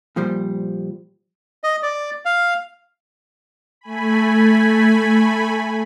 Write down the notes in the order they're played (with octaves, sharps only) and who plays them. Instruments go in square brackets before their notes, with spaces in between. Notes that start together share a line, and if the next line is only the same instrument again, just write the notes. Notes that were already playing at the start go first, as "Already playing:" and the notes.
[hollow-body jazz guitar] A#2 F3 G3 C5
[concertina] D#5
D5
F5
[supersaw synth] A3 G#5 B5